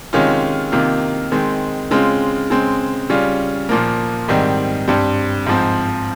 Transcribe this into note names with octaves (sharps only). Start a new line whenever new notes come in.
C3 D#3 G#3 C#4 F4
C3 D#3 A#3 F4
D#3 G#3 C4
C#3 G#3 C4 F4
C#3 G#3 C4
C#3 G3 C#4 F4
A#2 F3 A#3
G#2 D#3 G3 C4
G2 G3 C4
G#2 F3 C4